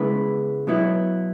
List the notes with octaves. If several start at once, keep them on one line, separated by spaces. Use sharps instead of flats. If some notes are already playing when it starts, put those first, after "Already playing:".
Already playing: C#3 G#3 B3 E4 B4
B2 F#3 B3 E4